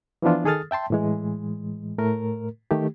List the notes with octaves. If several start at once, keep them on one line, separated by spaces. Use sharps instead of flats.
E3 F3 B3 D4 F4
D#3 G#4 A4 D#6 F6 A6
E5 G5 A5 C6
A2 E3 G#3
A2 A3 A#4
D#3 A3 G4